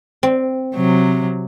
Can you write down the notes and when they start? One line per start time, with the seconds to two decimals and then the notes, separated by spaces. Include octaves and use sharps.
0.23 C4
0.75 C3 F#3